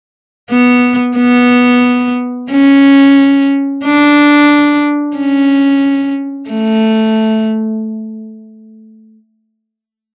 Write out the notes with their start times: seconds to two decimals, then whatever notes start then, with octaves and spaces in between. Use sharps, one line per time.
0.51 B3
1.17 B3
2.52 C#4
3.85 D4
5.17 C#4
6.51 A3